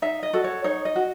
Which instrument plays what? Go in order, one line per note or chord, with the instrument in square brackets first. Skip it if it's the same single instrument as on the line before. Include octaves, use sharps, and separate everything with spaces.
[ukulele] D#4 E5
D#5
F#4 A4
C#5
D#4 C#5
D#5
F#4